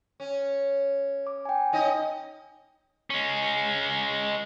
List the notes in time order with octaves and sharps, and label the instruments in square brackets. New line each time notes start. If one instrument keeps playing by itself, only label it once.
[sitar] C#4
[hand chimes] D6
G5 G#5
[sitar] C#4 D#4 D#5
[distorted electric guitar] G#3 C#4